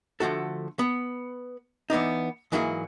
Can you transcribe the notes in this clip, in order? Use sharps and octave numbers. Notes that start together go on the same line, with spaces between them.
D3 F3 A3 F#4 A4
B3
E3 B3 D4 D#4
G#2 E3 F#3 A#3 E4 G#4